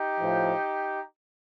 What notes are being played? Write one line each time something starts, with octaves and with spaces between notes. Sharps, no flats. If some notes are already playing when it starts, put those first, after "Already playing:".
Already playing: D#4 G4
A2 F3